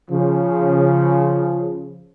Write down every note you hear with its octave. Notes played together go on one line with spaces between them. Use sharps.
C#3 F3